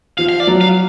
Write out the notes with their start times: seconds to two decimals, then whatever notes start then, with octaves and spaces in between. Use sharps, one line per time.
0.18 F3 F5
0.29 F5
0.40 D5
0.47 F#3
0.61 F5